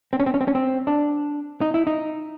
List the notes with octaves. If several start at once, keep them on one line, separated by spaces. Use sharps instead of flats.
C4
C#4
C4
C#4
C4
C#4
C4
D4
D#4
E4
D#4